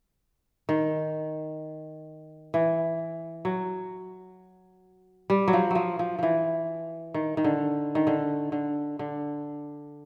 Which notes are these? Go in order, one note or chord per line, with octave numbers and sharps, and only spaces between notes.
D#3
E3
F#3
G3
F#3
F3
F3 F#3
F3
E3 F3
D#3
D#3
D3
D#3
D3
D3
D3